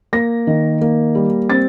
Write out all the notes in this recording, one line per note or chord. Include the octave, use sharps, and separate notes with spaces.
A#3 A#6
D#3
A#3
G3
C4 A6